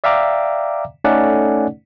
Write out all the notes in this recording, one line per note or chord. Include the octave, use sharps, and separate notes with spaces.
D5 E5 F5 G5 A#5 D6
A3 C#4 D#4 A4 D5 F#5